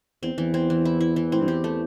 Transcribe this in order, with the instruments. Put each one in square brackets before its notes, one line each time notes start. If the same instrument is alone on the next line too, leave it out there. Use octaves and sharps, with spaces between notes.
[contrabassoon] E2 [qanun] C4
[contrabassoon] E2 [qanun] E3
[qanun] C4
E3
E4
E4
E3
[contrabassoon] A2 [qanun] C4
[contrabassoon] G2
[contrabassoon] E2 [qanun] G4
[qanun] A3